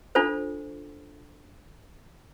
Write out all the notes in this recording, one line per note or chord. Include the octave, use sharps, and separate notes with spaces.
D4 F4 A4 C5